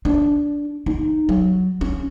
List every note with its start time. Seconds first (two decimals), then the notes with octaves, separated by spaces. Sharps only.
0.05 D4
0.86 D#4
1.29 F#3
1.81 C#4